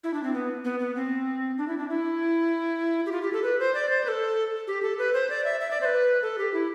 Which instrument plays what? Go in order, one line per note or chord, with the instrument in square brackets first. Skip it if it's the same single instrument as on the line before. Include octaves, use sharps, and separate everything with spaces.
[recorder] E4
D4
C4
B3
B3
B3
C4
D4
E4
D4
E4
G4
F4
G4
A4
B4
C5
D5
C5
B4
A4
G4
A4
B4
C5
D5
E5
E5
D5
C5
B4
A4
G4
E4